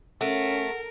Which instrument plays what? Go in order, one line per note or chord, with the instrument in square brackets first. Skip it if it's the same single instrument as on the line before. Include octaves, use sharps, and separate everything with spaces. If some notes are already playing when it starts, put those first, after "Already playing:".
[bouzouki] A3 [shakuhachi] C#4 [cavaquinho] F#4 F#5 [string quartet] A#4